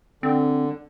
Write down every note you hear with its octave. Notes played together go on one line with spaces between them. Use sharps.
D3 C4